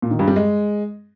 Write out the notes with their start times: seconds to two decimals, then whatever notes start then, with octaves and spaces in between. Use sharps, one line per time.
0.02 A#2
0.11 D#3
0.19 G2
0.28 G3
0.36 G#3